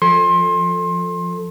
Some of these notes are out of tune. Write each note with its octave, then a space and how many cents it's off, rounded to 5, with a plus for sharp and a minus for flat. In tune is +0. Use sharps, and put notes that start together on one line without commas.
F3 +5 A4 +5 C6 +25